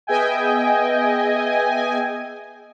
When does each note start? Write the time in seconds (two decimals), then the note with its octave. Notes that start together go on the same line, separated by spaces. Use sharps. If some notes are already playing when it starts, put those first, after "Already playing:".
0.07 B3 G#4 D#5 E5 G5 G#5